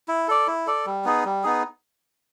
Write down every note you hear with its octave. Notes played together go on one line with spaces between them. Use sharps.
E4
A4 D5
E4
A4 D5
G3
B3 D#4 G#4
G3
B3 D#4 G#4